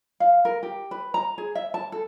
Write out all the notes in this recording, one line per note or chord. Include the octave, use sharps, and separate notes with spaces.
F5
A#4
G4
B4
A#5
G#4
E5
A5
A4